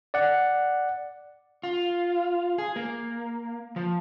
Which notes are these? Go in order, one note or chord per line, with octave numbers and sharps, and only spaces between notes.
D5 F#5
F4
G#4
A#3
F3